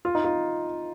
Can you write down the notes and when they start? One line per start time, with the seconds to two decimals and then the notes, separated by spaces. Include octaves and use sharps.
0.05 F4
0.15 D#4
0.24 F4